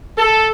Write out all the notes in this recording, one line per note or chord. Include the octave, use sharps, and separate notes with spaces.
A4